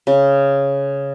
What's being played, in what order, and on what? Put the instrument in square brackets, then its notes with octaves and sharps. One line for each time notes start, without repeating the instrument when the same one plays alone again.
[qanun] C#3